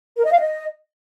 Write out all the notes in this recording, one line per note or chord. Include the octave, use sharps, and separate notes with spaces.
A#4
D#5
F5
D#5